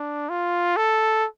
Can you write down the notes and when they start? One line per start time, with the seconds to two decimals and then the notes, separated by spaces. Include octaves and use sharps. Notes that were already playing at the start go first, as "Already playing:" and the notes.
Already playing: D4
0.30 F4
0.77 A4